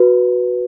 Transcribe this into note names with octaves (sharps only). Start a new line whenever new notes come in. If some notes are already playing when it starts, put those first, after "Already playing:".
Already playing: F#4 B4